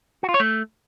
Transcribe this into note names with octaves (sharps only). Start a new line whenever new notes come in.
F#4
F4
C#5
A3